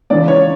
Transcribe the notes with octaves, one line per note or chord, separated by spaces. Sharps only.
C#2 C#3 E3 D5
C#5